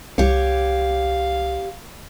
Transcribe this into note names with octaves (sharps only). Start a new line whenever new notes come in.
C2 G4 C#5 F5